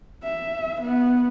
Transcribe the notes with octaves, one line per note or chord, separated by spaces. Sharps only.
E5
B3